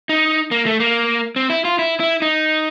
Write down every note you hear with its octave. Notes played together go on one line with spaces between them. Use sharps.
D#4
A#3
A3
A#3
C4
E4
F4
E4
E4
D#4